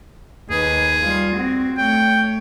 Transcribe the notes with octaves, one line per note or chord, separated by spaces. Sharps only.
D#2 G#4 B4
G3 F4
C4 F#4
A3 C#5 G5